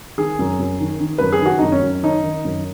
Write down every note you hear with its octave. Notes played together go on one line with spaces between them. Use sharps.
D#3 G#4
F#2
F#2
D#3
D#3
F#2 B4
G#4
D#3 F#4
F#2 D#4
C#4
F#2
D#3 D#4
D#3
F#2